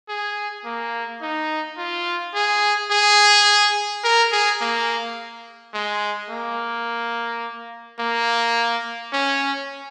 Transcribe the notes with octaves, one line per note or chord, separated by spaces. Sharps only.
G#4
A#3
D#4
F4
G#4
G#4
A#4
G#4
A#3
G#3
A#3
A#3
C#4